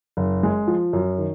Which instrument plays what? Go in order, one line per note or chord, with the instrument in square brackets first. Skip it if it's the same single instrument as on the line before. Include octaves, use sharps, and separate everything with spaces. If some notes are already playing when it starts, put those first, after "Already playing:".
[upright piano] F#1
G#3
F3
F#2
D#3